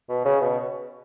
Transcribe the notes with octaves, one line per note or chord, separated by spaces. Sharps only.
B2
C#3
B2